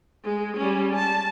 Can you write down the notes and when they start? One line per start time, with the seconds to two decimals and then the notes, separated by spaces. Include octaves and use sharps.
0.24 G#3
0.57 G3 C#4
0.95 A5